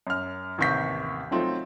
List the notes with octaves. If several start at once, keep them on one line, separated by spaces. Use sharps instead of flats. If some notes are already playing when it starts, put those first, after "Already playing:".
F#2 F6
A1 D#2 C3 C#6 G6 B6
F3 F#3 A3 C4 D#4 F4